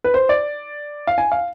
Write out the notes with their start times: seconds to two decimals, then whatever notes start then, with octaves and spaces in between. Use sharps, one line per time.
0.04 B4
0.14 C5
0.29 D5
1.07 F5
1.18 G#5
1.32 F5